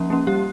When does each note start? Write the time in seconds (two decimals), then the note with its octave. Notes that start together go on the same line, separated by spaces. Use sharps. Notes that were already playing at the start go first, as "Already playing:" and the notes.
Already playing: F3 A#3 C#4
0.10 A#3 C#4
0.27 G3 G4